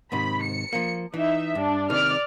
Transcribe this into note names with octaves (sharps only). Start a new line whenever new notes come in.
G#2 C3 D#3 B5
C#7
F3 A#3
E3 D#4 E5
G2 D4
C3 D#3 D5 F6